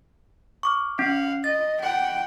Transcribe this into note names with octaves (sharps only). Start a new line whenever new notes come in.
C#6 D6 F6
C#4 F5 F#5
D#5 A6
F#5 G5